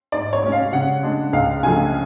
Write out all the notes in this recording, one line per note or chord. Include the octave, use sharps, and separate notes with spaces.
G#2 D5
C#5
G#3 C#4
F5
C#3 F#5
G#3 D4
C#2 F5
C#3 F3 A3 D4 G#5